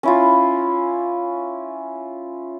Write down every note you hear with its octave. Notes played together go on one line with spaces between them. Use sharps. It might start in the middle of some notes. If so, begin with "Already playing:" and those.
C#4 E4 F4